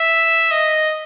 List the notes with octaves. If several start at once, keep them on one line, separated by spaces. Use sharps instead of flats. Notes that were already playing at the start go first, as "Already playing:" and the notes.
Already playing: E5
D#5